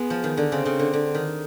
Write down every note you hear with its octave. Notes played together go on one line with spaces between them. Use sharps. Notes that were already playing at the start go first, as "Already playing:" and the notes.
Already playing: G#3 B3
F3
D#3
D3
C#3 C4
C#3
D3
D3
D#3